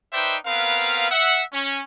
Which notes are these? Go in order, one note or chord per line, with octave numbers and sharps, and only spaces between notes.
D#4 B4 C5 D5 E5 G5
B3 C4 A#4 B4 F5
E5 F#5
C#4